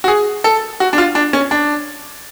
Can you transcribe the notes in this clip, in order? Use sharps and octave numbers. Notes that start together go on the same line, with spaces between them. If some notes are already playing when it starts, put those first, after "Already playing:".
F#4
G#4
A4
F#4
D4
F4
D4
C#4
D4